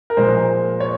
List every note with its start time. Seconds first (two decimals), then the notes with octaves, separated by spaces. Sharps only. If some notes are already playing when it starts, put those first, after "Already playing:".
0.10 A#4
0.17 A#2 F3 G#3 C5
0.80 C#5